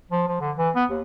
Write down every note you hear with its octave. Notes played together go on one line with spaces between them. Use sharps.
F3
F3
D3
E3
B3
D#2